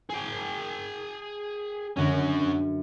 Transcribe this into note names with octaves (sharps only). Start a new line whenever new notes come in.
G#4 G5
F#2 D3 G#3 C#4 F#4